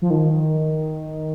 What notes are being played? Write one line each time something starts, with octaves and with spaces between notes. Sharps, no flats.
F3
D#3